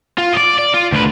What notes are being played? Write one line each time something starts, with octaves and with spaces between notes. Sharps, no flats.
F4
D5 D#5
D5
F4
D2 B4